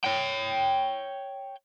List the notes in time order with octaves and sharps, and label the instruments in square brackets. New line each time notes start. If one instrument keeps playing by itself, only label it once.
[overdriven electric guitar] C#5 G5